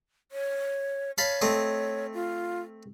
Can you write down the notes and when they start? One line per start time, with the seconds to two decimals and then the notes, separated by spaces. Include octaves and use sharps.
0.32 C#5
1.18 C#5 F5 A5 B5
1.42 A3 C4 D#5
2.14 F4